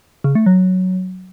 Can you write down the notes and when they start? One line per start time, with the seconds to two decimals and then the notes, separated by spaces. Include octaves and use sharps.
0.24 C#3
0.35 A3
0.46 F#3